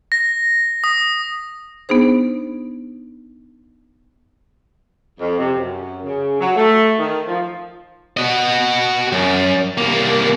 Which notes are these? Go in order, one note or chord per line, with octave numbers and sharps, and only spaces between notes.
A#6
D#6
B3 D4 D#4 G#4 C5
F2
C3
F#2
C#3
F#3
A3
D#3
F3
F#4 D#5
F#2
C2 A#3